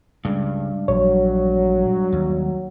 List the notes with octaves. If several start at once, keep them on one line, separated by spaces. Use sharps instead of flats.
G2 C#3 G#3
A#1 F#3 C#5
D#2